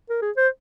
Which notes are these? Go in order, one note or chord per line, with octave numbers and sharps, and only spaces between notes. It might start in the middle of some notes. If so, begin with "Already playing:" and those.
A#4
G#4
C5